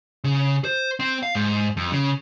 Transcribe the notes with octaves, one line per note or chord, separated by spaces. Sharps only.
C#3
C5
C4
F5
G#2
F2
C#3